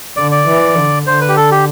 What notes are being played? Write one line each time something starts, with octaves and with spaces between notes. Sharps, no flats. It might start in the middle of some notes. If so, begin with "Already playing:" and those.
D3 D5
D5
E3
D3
D3 C5
B4
G4
A4
G4